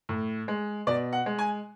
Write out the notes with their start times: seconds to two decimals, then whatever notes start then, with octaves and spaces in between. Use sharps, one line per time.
0.09 A2
0.48 G#3
0.87 B2 D5
1.13 F#5
1.26 G#3
1.39 G#5